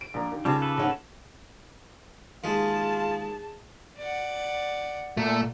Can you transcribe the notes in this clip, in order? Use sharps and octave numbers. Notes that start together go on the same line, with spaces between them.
D7
A#1 A#2 A#5
D#2
C#3 G3 C4 F4 A5 D6
A4 B4
A#1 C#4 F#5
D#2 G#3 F4 G#4 A5
D5 F#5
A#2 A3